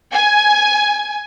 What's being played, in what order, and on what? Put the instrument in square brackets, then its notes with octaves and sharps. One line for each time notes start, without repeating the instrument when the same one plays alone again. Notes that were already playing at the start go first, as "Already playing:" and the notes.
[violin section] G#5